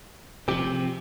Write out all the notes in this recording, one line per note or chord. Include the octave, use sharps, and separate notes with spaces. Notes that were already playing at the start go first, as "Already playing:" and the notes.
C3 F3 C4 G4